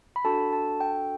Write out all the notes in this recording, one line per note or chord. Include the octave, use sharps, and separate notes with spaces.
B5
D4 F#4 A4 A5
A5
G5